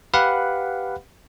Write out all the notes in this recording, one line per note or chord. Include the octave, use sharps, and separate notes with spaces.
G4 B4 F5 F#5 B5